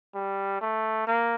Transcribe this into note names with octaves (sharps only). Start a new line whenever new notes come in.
G3
A3
A#3